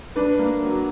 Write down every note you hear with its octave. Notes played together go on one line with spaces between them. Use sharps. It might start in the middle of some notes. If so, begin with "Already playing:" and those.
D4 B4
A#3
F#3